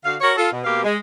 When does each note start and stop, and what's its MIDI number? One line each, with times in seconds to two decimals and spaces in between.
0.04 0.16 50
0.04 0.16 66
0.04 0.16 77
0.21 0.33 66
0.21 0.33 70
0.21 0.33 73
0.37 0.50 65
0.37 0.50 69
0.51 0.61 47
0.64 0.83 47
0.64 0.83 58
0.64 0.83 67
0.64 0.83 77
0.83 0.96 56